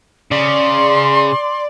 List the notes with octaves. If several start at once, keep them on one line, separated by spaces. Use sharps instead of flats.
C#3 D5 C6